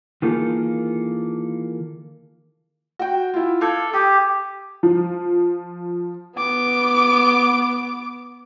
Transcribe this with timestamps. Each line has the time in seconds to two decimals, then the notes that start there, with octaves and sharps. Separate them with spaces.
0.22 D#3 E3 A#3 F4 G#4 A4
2.99 F#4 G5
3.34 E4 F4
3.61 A4 F5 D6 G#6
3.93 G4 D#6
4.83 F3
6.36 B3 D6